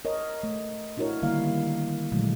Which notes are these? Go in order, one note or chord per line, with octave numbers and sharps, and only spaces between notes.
A#4 C#5 D#5
A3
D4 E4 F#4 A#4 C#5
D3 D#3 G3 A#3 E4 F5
A#2 D3 E3 F#3 G#3 A3